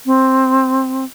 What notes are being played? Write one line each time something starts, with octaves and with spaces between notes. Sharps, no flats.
C4